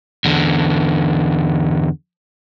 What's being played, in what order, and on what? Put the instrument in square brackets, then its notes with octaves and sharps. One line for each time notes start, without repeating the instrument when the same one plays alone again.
[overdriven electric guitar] E2 D3